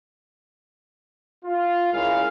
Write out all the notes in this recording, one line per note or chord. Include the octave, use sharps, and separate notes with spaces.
F4
C#2 G#3 C#4 E4 A#4 F5